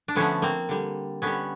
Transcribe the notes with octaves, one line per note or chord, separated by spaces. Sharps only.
D4
D3 F3 A3 B3 C#4
A#3 C4
D3 G3
D3 G3 B3 C#4